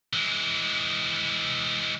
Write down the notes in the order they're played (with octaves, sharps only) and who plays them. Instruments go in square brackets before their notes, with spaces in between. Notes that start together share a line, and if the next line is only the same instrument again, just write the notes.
[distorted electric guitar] E3 G#3